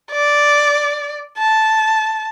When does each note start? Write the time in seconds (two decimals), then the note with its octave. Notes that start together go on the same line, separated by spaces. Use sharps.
0.11 D5
1.38 A5